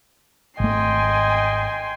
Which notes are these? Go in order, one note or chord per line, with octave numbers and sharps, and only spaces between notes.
G#1 A3 D#5 G5 G#5 C6